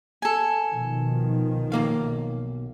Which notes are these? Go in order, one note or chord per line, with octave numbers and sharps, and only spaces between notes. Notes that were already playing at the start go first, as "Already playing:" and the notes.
A4 G#5
B2 D#3 F3
B1 A#3 F5